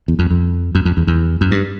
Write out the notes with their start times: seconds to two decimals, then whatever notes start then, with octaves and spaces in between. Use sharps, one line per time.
0.08 E2
0.19 F2
0.31 F2
0.75 F#2
0.85 F2
0.97 E2
1.07 E2
1.41 F#2
1.51 G2